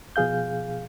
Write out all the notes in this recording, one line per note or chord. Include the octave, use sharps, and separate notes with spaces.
B2 F3 G#4 F5 G6